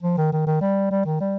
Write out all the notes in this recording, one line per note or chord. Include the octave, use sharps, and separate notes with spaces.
F3
D#3
D#3
D#3
G3
G3
D#3
G3